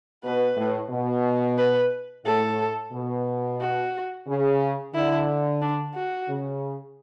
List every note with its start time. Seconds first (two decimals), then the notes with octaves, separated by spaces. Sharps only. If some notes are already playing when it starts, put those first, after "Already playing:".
0.23 B2 B4
0.57 A2
0.90 B2
1.58 B4
2.25 A2 A4
2.93 B2
3.60 F#4
4.27 C#3
4.94 D3 E4
5.62 D4
5.95 F#4
6.29 C#3